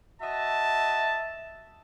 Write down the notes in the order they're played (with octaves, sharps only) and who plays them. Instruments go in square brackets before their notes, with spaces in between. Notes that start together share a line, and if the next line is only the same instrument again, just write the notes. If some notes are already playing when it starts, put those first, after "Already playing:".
[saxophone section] F#4 D#5 E5 [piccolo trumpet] A5